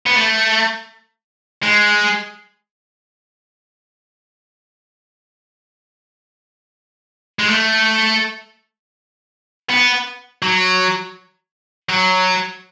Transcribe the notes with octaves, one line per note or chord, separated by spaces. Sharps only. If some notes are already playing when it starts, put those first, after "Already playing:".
B3
A3
G#3
G#3
A3
B3
F#3
F#3